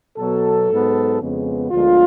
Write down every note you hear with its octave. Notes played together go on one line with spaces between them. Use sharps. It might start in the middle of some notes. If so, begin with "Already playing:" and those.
B2 F#3 B3 A4
G#2 F#3 B3
F2 C#3 G#3 B3
D2 D3 F3 G#3 B3 F4